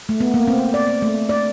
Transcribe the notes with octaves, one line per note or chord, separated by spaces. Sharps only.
A3
B3
A#3
C4
D5
A3
D5